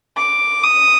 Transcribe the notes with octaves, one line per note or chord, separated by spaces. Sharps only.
D6
D#6